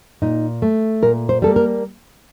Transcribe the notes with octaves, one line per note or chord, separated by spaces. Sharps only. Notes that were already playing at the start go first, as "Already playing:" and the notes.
A#2 D#4
A3
A#2 A#4
C5
G3 A#3 A4
A#4